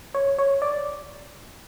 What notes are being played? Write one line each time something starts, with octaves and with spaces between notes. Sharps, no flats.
C#5
C#5
D5